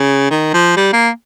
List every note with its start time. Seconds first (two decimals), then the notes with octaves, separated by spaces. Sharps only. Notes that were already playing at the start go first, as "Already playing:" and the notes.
Already playing: C#3
0.30 D#3
0.54 F3
0.76 G3
0.93 A#3